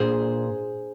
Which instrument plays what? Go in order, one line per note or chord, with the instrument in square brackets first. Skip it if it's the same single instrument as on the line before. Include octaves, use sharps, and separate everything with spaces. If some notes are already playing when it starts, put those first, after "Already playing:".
Already playing: [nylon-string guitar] A#2 D4 G#4 C5